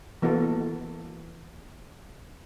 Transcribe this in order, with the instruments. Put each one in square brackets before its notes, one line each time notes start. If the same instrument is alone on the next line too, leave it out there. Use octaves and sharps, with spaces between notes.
[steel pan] E3 A#3 B3 F#4 A4